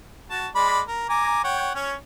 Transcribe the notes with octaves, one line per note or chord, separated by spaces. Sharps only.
F#4 A5
G#3 D5 B5
A#4
G#5 A#5 D6
C#5 F#5 G5
C#4 C#5